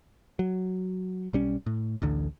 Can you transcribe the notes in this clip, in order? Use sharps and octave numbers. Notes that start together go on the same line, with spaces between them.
F#3
B1 G3 C#4
A2
A1 D2 D3